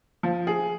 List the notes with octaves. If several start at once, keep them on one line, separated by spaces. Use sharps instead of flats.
F3
G#4